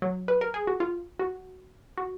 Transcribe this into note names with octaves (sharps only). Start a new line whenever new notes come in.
F#3
B4
A#4
G#4
F#4
F4
F#4
F#4